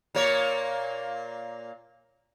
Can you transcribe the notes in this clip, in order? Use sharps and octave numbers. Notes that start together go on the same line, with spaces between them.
A#2 A#3 C#5